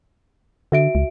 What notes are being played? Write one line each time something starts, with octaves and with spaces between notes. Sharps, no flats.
D3 F#4 E5 D7
C#2